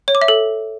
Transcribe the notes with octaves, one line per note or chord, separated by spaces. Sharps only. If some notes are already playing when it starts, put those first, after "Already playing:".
C#5
D6
E5
A4